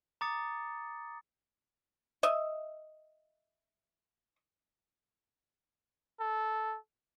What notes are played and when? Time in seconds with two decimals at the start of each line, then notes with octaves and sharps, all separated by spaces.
0.21 A#5 D6 D#6 A6 C#7
2.23 D#5 E5
6.20 A4